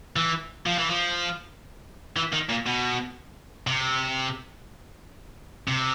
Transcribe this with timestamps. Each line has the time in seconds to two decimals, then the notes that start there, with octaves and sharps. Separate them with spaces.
0.16 E3
0.66 F3
0.79 E3
0.90 F3
2.17 E3
2.33 D#3
2.50 A#2
2.67 B2
3.67 C3
5.68 C3